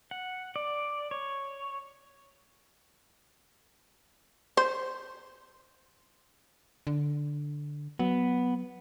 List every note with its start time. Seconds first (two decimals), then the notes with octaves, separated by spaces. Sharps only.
0.11 F#5
0.56 D5
1.11 C#5
4.57 C5
6.87 D3
7.99 F#3 B3